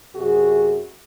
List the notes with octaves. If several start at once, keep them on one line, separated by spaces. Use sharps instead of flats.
F#2 C3 F#4 G#4